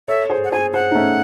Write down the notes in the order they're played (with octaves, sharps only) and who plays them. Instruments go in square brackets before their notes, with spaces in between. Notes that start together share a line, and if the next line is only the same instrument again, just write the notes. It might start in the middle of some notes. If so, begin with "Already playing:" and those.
[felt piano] A4 C#5 [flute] E5
[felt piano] G#4 C5
[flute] F#5
[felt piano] G#4 C5 [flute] G#5
[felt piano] G#4 C5 [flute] F#5
[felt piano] D#4
A3 C#4